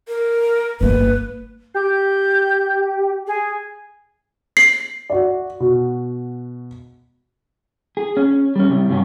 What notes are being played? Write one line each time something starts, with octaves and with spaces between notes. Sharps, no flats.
A#4
G1 A#3 B4
G4 G6
G#4
C7
F#4 D5
B2 F#4
G#4
C#4
G3 C#4
C3 G3
G2 C3 F#3 C#4